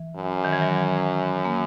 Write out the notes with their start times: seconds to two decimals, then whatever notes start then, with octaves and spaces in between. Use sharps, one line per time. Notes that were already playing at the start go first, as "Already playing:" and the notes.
Already playing: E3
0.17 F#2
0.44 D#3
0.53 E3
0.62 F#3
1.45 A#3